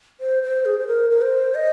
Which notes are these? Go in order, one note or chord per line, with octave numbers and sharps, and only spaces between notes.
C5
C5
G#4
C5
A#4
A#4
C5
D#5